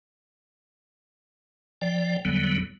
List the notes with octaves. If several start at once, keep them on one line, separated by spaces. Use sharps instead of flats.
F3 D5 G5
E2 D3 F#3 G3 B3